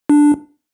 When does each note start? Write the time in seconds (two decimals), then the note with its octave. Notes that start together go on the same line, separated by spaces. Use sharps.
0.10 D4